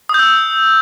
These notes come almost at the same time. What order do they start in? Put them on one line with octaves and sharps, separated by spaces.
D#6 G6 E6